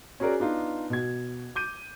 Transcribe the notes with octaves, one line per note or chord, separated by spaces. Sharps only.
C#4 F#4 G#4 A#4 D5
B3 D4 D#4 F4
B2 G#6
D6 G6 D#7